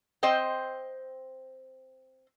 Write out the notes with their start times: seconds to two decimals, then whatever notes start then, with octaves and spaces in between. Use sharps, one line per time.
0.23 C4 C5 D#5 G5